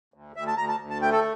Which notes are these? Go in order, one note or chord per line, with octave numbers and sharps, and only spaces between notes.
D2
D2 E5
A5
D2 A#5
A5
D2
A5
A3 G5
A4